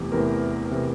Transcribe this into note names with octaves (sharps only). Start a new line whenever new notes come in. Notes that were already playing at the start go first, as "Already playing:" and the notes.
Already playing: E2 C3 E3 A3 G4
E2 C3 E3 A3 A#4
C3 E3 A3